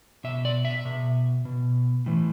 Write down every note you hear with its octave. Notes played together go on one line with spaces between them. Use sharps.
B2 E5
D5
E5
B2
B2
A2 E3